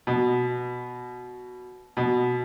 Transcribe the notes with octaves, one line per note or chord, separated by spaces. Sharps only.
B2
B2